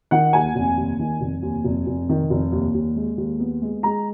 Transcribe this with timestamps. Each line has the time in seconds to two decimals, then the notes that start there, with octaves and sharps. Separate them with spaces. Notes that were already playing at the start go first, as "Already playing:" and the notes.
0.11 D#3 F#5
0.33 D#2 G#5
0.55 F1
0.77 D#2
0.99 D#3
1.21 F1
1.43 D#2
1.64 F1
1.87 F1
2.09 D#3
2.30 F1
2.53 D#2
2.74 D#2
2.96 G#3
3.18 D#2
3.40 B3
3.62 G#3
3.83 G#3 A#5